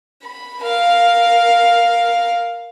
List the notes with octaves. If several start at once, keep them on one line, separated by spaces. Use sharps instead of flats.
B5
A#4 F5